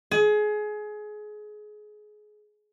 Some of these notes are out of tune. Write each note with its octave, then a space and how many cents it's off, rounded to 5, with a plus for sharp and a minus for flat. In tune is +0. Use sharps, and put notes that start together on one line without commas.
G#4 +25